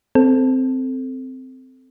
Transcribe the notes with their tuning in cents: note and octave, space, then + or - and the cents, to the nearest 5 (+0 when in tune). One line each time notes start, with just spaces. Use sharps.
C4 -10 A4 +0